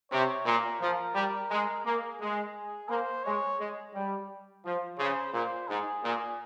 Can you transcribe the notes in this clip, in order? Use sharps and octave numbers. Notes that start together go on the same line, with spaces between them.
C3 C#5
A#2 A#4
F3
G3 A#4
G#3
A#3 G#4
G#3
A#3 C5
G#3 C#5
G#3
G3
F3
C#3 C5
A#2 C5
G#2 G#4
A#2